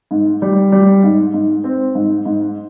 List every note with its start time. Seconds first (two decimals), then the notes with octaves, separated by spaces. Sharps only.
0.11 G#2
0.42 G3
0.72 G3
1.04 G#2
1.34 G#2
1.64 C4
1.95 G#2
2.25 G#2